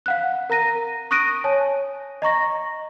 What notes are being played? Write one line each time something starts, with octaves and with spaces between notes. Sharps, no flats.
F5 F#5 F#6
A#4 A#5 A#6 D#7
C#6 D#6 F#6 A#6 D7 D#7
C#5 G#5 A5
D#5 A#5 C#6 A#6